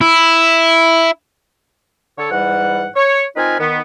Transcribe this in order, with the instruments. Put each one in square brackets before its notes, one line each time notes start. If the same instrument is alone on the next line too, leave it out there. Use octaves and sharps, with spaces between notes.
[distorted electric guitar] E4
[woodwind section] D3 A4 C#5
G#2 E3 G3 F#5
C#5
C4 D#4 F4 A#4 B4 G#5
D#3 B3